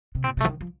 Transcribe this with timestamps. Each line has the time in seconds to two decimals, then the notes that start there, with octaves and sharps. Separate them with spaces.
0.15 C3
0.24 A#2 C4
0.37 C3
0.41 A3
0.45 F3
0.48 D#3
0.61 F3